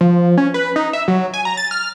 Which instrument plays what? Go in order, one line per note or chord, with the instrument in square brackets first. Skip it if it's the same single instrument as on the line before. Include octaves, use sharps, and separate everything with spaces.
[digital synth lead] F3
C#4
B4
D#4
E5
F#3
G#5
A#5
A6
F6